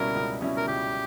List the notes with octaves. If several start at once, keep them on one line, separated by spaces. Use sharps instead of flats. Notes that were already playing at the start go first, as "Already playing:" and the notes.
Already playing: C#2 B2 G3 C#4 E4 A#4
C#2
B2 G3 C#4 E4
A#4
C#2 G4